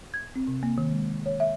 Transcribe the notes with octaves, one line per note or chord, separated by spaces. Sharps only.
G#6
C4
C3
A#3
D#3
G#3
C#5
E5